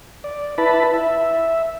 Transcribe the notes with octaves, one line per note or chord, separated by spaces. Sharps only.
D5
E4 B4 A5 B5
E5